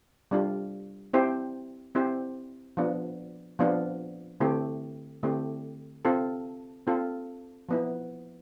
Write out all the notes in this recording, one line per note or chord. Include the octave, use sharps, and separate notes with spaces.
G3 D4 F4
C4 E4 G4 C5
C4 E4 G4 C5
F3 B3 D4 F4
F3 B3 D4 F4
D3 A3 C4 E4 G4
D3 A3 C4 E4 G4
C4 F4 A4
C4 F4 A4
F3 B3 E4